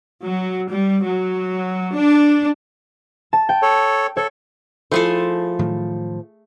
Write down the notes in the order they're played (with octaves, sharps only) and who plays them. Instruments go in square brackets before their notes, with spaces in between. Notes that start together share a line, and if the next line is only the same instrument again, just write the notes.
[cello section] F#3
G3
F#3
D4
[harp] A5
G5
[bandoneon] A4 C#5
[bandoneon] A4 [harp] C#5
[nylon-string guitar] F3 E4 C5 [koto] A3 G#4 A4
[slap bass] A2 D#3 F#3